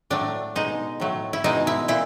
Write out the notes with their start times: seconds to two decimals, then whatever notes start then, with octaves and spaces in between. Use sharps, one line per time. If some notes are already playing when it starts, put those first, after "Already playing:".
0.10 A2 F#3 A3 D4
0.56 B2 G#3 D#4
1.00 A2 F#3 A3
1.33 E4
1.44 B2 G#3 D#4
1.67 E4
1.88 A#2 E4